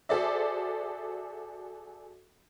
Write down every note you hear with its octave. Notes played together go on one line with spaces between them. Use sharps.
F#4 G#4 A4 C5 D5 E5